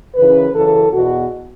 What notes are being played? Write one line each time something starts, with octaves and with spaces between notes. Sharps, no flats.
F#2 C#3 E3 B4
F#2 C#3 E3 A4
E2 B2 F#4